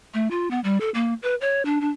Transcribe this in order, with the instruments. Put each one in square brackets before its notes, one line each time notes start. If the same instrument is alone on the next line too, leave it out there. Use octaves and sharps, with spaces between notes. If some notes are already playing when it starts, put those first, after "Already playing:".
[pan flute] A3
F4
B3
G3
A4
A#3
B4
C#5
D4
D4